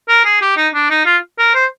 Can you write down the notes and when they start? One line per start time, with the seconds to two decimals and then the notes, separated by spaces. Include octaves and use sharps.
0.09 A#4
0.25 G#4
0.42 G4
0.57 D#4
0.74 D4
0.90 D#4
1.06 F4
1.39 A#4
1.54 C5